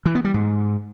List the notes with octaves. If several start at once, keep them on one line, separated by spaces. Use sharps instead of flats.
E3
B3
G3
G#2